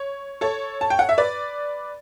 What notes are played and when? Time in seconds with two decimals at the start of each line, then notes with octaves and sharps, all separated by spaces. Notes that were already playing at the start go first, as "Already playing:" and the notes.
Already playing: C#5
0.41 A4 C#5
0.81 A5
0.90 G5
0.99 F#5
1.09 E5
1.18 B4 D5